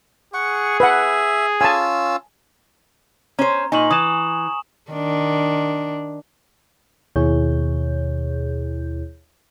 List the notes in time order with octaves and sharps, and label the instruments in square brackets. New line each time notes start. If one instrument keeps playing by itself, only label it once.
[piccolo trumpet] G#4 [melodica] F#5 C#6
[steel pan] B4 F#5 [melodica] E5
[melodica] C#4 F4 E6 [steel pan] G#5 A5
[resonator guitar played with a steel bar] C#4 C5 [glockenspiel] A#5
[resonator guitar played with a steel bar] A#2 D#4 [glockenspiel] G#5 C#6 F#7
[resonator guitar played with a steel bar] E3 [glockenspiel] D#6 E7
[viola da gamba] D#3 D4
[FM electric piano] D#2 B2 E4 G#4 C#5 G6